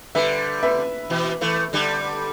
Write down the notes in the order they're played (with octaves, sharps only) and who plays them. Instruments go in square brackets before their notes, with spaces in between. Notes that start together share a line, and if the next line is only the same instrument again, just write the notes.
[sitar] D3 G3 [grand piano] B4 E5
[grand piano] B4 E5
[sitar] B2 E3
E3 A3
D3 G3